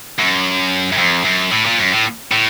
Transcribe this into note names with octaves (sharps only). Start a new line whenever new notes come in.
F#2
F#2
F2
F#2
A2
A#2
F#2
A2
A2